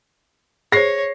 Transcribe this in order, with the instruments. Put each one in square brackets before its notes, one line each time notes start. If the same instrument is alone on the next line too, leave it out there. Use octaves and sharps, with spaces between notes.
[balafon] G#4 C5 [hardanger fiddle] C#5 [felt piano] A#6 C7